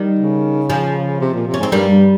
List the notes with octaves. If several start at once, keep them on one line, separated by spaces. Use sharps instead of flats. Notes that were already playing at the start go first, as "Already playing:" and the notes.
Already playing: D#3 G3
C#3
F3 G#3
C3
A#2
C3
C#4
G#2 C4
G2 G3 A#3
G2